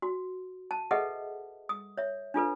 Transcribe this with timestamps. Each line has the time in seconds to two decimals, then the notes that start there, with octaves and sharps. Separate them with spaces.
0.02 F#4
0.71 A5
0.91 G#4 A4 B4 D#5 E5 F#5
1.69 D#6
1.97 C#5 E5
2.34 D4 F4 A4 B4